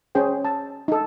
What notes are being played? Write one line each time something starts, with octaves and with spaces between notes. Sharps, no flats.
C#4 G#4 C5 G5
A5
D#4 A4